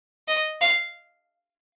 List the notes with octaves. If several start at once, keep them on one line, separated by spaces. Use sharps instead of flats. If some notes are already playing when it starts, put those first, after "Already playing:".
D#5
F5